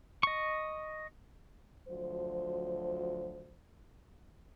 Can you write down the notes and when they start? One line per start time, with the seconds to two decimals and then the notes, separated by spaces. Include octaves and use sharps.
0.23 D#5 C#6
1.88 D2 F3 F#3 C5